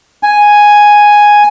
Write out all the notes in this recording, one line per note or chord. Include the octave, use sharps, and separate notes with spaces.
G#5